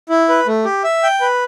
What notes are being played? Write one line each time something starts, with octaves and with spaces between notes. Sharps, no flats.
E4
B4
A3
G4
E5
G5
B4